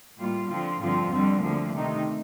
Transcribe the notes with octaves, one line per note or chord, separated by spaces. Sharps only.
A2 G3 A#3 F4
D3 F3 C4 F4
G2 D3 F3 C4 F4
F2 D3 G3 C4
D2 D3 F3 A#3
C3 D#3 A3 D#4